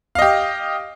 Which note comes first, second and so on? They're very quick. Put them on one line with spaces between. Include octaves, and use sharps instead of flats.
F5 D#5 G4